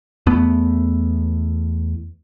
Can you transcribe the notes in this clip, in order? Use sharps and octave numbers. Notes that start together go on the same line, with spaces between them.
E2 A3 B3